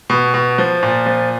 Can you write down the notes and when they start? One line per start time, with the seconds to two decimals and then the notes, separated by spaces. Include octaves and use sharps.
0.10 B2
0.34 B2
0.58 F3
0.83 A#2
1.06 F3